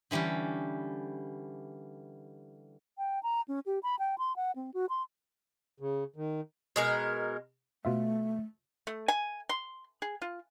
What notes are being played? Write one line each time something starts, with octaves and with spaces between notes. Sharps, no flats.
D3 E3 G3 C#4 G4
G5
A#5
C#4
G4
B5
G5
C6
F#5
C4
F#4
C6
C#3
D#3
B2 G#3 A#4
B2 A3 F4 E5
A3
G#5
C6
G#4
F4